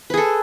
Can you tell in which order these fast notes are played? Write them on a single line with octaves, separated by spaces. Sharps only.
B4 G#4 A4